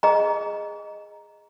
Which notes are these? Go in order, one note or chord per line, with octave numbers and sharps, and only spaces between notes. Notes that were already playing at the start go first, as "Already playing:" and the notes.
G#4 D#5 A#5